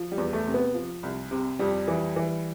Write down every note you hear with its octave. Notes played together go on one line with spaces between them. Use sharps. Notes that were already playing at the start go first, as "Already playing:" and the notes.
Already playing: F3
G3
E2
A3
C3
B3
F3
C2
C3
F2 G3
E3
E3